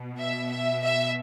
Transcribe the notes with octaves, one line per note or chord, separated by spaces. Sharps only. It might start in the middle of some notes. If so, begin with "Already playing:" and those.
Already playing: B2
E5
E5
E5